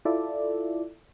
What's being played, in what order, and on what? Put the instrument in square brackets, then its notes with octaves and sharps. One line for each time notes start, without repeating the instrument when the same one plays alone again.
[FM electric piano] E4 F4 A4 D5 E5